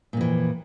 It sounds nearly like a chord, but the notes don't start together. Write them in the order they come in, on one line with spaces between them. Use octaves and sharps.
A#2 F2 E3